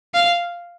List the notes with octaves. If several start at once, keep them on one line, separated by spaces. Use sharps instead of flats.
F5